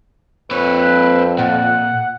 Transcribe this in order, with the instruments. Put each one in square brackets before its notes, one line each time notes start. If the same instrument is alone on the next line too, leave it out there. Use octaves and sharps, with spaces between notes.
[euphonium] F2 [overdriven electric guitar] C4 C#5 [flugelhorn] B4
[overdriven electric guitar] A#2 [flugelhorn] F#5